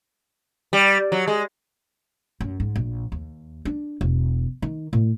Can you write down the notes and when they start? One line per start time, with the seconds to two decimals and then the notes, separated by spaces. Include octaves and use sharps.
0.73 G3
1.12 F#3
1.28 G#3
2.41 F#2
2.60 G#2
2.76 A#1
3.12 D#2
3.65 D4
4.01 E1
4.62 D#3
4.93 A2